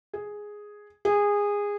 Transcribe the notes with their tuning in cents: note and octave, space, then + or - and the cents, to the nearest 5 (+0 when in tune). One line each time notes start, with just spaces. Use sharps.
G#4 +0
G#4 -20